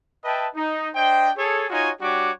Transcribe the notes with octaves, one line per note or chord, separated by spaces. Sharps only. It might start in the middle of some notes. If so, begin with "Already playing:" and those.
B4 D#5 E5 G5 A5
D#4
D4 C5 D#5 G5
G#4 A4 C#5
D#4 F4 F#4 C#5 D#5 G#5
G3 D4 F#4 G4 C#5 D6